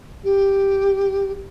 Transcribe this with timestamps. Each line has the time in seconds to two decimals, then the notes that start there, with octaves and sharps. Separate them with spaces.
0.23 G4